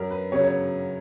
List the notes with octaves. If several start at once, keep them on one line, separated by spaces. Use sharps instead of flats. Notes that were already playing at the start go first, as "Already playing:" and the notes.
Already playing: F#2 A#4
B4
C#3 F#3 C#5
C#5